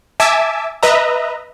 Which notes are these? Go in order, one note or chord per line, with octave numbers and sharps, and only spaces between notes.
E5 G#5 A5 D6 E6
B4 D#5 E5 A#5